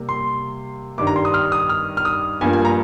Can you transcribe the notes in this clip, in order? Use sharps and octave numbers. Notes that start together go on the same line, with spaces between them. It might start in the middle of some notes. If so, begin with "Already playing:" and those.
Already playing: C3 G3 A#3
C6
G2 D#3 G3 D4 D6
A#5
C6
D#6
F6
D#6
F6
F6
D#6
G2 F3 A#3 G#5
G#5
A#5